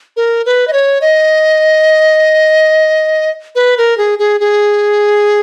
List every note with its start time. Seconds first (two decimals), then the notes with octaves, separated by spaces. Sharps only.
0.17 A#4
0.46 B4
0.68 D#5
0.73 C#5
1.01 D#5
3.55 B4
3.78 A#4
3.98 G#4
4.19 G#4
4.40 G#4